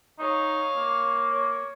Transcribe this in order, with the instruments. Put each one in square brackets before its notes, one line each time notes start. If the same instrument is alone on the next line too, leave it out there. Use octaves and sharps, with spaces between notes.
[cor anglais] D#4 [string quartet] C#5 F5 A#5
[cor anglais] A#3
[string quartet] C#5